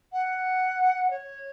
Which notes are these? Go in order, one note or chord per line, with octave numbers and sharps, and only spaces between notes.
F#5
C#5